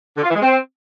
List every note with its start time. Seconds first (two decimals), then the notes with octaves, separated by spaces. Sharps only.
0.17 D3
0.23 F4
0.29 E3
0.35 G#3
0.41 C4